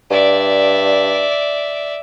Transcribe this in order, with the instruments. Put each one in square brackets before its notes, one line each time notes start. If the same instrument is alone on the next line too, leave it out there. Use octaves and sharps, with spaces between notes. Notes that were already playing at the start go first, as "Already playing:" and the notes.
[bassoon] G2 [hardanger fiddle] D5 E5